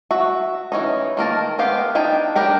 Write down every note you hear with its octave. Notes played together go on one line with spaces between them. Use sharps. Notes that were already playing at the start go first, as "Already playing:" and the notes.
F#4 E5
E3 C#4 D#4
D#3 A#3 A#4 A5
G#3 B3 G4 F5
D4 D#4 G5 G#5
D4 G4 A#4 G5 B5